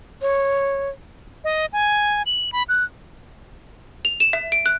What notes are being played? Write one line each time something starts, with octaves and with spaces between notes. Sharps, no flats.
C#5
D#5
G#5
F#7
B5
F#6
F7
E7
E5
D7
F#6